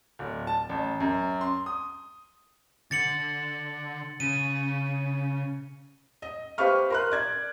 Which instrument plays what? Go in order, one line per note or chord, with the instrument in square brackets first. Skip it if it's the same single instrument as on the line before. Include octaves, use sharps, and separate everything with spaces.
[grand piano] D1
A5
A1
F#2
C6
D#6
[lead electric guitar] D3 [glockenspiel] A6 C#7 F#7
[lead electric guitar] C#3 [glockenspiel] D#7
[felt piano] D#5
G4 B4 C5 F5 C#6 F6
A#4 C6 F#6
D5 G#6